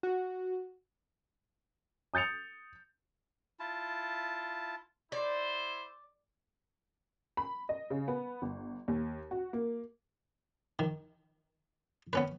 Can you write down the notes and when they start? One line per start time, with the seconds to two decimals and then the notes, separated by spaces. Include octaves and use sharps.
0.03 F#4
2.14 D#6 G6 A6 C#7 F7
3.60 E4 F4 A5
5.12 E4 C5 D5
7.37 B5
7.69 D#5
7.90 C#3
8.08 B3
8.42 G1
8.88 D#2
9.31 F#4
9.53 A#3
10.79 D#3
12.13 B3 C#4 B4